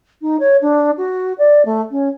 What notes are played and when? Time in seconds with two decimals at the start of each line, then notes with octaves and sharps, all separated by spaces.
0.21 D#4
0.39 C#5
0.61 D4
0.97 F#4
1.38 D5
1.65 A3
1.90 C#4